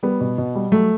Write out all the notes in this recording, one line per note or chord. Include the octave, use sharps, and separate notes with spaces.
G3 B3
B2
B2
G3
F#3 A3